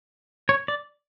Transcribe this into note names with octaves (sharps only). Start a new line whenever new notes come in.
C#5
D5